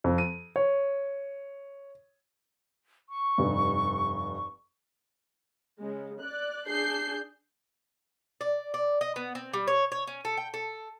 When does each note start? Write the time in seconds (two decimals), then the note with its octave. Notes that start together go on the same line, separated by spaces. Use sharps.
0.04 F2
0.18 D#7
0.56 C#5
3.10 C#6
3.38 F1 G2
5.80 C#3 G#3
6.21 D5 F#6
6.68 D4 G#4 G6 C7
8.41 D5
8.74 D5
9.01 D#5
9.16 B3
9.35 C4
9.54 G3
9.68 C#5
9.92 C#5
10.07 C#4
10.25 A4
10.37 G5
10.54 A4